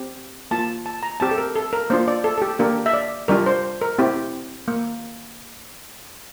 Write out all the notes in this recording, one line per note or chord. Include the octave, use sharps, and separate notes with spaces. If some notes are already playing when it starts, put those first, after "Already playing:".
Already playing: C4 G4
A#3 F4 A5
A5
A#5
C4 G4 A5
A4
A#4
A4
A#4
A#3 D4 F4 C5
D5
A4
A4
G4
A#3 D4 G4 A#4
E5
D5
G3 D4 F4 A#4
C5
A#4
C4 E4 G4
A#3